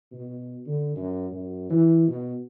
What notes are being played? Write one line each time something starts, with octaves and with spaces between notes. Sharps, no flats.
B2
D3
F#2
F#2
E3
B2